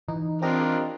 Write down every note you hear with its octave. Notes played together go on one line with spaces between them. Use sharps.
E3 D#4
C4 D4 F4 G4 A#4 D#5